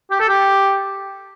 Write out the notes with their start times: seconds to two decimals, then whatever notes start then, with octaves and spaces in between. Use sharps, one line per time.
0.11 G4
0.20 A4
0.29 G4